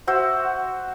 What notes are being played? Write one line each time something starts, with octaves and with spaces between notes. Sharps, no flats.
F#4 C5 E5